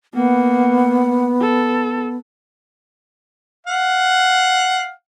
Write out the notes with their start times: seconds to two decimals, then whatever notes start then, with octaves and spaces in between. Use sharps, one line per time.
0.14 A#3 B3 F#5
1.41 A4
3.67 F5 F#5